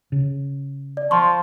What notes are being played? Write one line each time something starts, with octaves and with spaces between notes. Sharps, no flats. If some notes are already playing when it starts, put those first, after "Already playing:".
C#3
D5
F3 C6 C#6